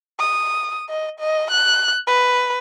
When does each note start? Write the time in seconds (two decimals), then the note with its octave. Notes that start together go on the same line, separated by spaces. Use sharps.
0.20 D#6
0.89 D#5
1.20 D#5
1.51 F#6
2.08 B4